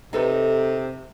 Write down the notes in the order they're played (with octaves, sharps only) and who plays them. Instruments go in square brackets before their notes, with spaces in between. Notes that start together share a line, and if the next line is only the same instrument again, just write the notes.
[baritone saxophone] C3 [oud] D#4 A4 B4